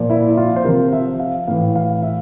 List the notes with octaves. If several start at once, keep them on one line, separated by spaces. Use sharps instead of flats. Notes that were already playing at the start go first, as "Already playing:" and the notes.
Already playing: A#2 F3
E4
F4
C5
C3 F3 A#4
E5
F5
A2 E3 F5
F5
E5